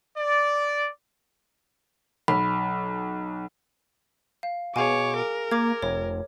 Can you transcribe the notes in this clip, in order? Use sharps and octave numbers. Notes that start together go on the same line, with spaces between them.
D5
B1 B5
F5
B2 G#4 C#5 F5 G#5 D6
A#4
A#3 D6 G#6
F1 C#5